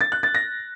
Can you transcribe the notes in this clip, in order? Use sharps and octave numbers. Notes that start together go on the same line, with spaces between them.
A6
F#6
A6
A#6